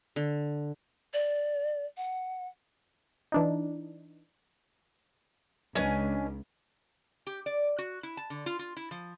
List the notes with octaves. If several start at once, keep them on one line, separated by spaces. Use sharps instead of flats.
D3
D5
F#5
E3 D4 D#4
C#2 C#4 D4 B4 D#5 G#5
G4
D5
F#4
E4
A5
D3
F4
F4
E4
F3